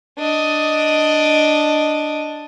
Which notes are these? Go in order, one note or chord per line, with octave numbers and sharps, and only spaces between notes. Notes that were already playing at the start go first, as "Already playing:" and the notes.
D4 D#5